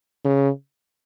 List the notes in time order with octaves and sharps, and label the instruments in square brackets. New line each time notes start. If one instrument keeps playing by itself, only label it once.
[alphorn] C#3